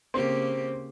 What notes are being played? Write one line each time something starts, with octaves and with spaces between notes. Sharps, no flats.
C#3 A#3 C4 G4